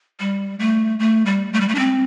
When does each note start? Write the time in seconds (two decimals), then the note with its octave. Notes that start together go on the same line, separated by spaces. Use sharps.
0.20 G3
0.59 A3
0.99 A3
1.26 G3
1.53 A3
1.61 G3
1.68 A3
1.75 D4
1.79 C4